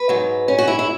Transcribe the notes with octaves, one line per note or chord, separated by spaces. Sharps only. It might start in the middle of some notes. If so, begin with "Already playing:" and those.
Already playing: B4
G#2 F#3
C#4
F#4
E4
E4